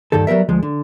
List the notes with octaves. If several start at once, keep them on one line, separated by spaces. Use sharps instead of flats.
D2 G2 D#3 G3 A4
F#3 G3 B3 A#4 E5
D2 F3 G#3
D3